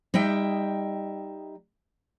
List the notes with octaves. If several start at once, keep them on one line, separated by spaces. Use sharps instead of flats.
G3 D#4 D#5 E5 G5